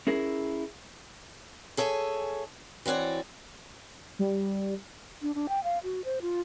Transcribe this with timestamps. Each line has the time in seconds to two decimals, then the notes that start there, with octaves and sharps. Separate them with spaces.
0.07 C#4 E4 G#4 A#4
1.77 G#4 A4 C#5 E5 G#5
2.86 E3 C4 F#4 C#5 D5
4.19 G3
5.22 D4
5.35 D4
5.49 G5
5.64 F5
5.83 F#4
6.05 C5
6.22 F4